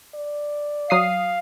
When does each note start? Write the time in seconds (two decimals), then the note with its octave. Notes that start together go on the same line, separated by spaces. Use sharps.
0.15 D5
0.90 F#3 F5 D#6 C7